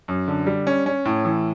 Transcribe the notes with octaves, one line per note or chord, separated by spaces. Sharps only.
F#2
D3
G3
C#4
C#4
A2
E3